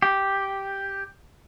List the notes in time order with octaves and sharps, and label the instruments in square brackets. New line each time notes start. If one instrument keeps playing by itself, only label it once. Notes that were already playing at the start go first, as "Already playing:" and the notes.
[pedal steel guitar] G4